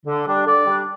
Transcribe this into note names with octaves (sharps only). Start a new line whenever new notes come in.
D3
G3 D4
D3 D5
G3 D4